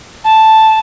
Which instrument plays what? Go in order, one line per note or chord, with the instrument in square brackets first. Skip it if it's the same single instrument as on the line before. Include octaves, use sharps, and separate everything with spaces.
[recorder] A5